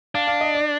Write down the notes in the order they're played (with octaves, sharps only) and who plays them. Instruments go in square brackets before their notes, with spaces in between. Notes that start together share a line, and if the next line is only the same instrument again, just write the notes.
[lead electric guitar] D4 [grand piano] F5
[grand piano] F5
D#5
D5